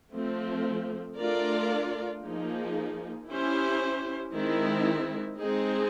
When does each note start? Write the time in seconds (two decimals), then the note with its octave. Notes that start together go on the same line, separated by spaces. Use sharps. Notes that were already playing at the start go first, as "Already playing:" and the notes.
0.12 F3 A3 C4
1.17 A3 D4 F4 A#4 D5
2.23 F3 A#3 D#4 G#4
3.28 C#4 E4 G4 C5
4.34 D#3 G#3 C4 E4
5.39 G#3 C4 D#4 G#4